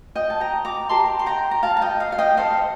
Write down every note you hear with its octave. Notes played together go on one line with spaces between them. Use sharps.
D#5 G5
A5
G5 A#5
A#5 D6
G4 A#4 D#5 A5 C6
C6
G5 A#5
A#5
F5 A5
A5
D#5 G5
F5
F5
D#5 G5
A4 C5 D#5 F5